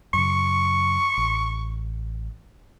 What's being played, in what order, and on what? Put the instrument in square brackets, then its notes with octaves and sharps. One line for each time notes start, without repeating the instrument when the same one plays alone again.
[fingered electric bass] F#2 C#3 [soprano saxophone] C#6
[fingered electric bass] A1